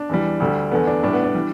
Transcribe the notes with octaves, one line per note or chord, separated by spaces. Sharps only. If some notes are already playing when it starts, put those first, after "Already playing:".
Already playing: D4
E2 E3 G3
D2 D3 G3
E2 D3 A3 B3
D4
A2 G3 D4
B3
D4
E3 G3